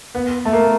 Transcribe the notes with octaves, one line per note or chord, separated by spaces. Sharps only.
B3
A3
A#3